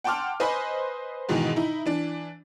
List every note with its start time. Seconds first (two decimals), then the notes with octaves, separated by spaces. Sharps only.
0.04 F#5 G5 A5 C6 D6 F6
0.40 B4 C5 D#5 G#5 B5 C6
1.29 G#2 B2 D#3 E3
1.56 D#4 E4
1.85 E3 D4